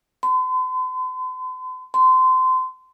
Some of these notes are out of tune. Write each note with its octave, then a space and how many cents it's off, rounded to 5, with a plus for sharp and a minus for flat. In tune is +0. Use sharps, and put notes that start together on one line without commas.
C6 -45
C6 -25